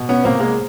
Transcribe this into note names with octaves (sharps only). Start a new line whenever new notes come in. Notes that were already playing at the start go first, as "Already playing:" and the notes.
Already playing: B2
B3 C#4
C2 A#3 C4
G#3 A#3